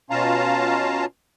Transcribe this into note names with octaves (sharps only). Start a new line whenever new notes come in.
B2 C#4 F4 F5 A5 A#5